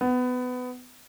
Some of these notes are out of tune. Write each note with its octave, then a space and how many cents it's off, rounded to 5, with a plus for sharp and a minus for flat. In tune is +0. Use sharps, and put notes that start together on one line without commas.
B3 +20